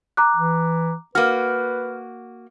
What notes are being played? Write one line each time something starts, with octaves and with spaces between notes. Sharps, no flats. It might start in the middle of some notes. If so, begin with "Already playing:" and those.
A#5 D6 F#6
E3
A#3 F#4 B4 F6